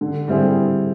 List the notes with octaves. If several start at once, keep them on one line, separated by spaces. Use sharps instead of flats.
D3
G3 C4 E4 G#4